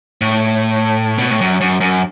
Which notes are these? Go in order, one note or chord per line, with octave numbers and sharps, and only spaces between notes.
A2
B2
A2
F#2
F#2
F#2